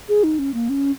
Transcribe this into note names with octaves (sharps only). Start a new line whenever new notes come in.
G#4
D#4
C#4
A#3
C#4